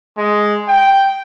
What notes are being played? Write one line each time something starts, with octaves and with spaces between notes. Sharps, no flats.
G#3
G5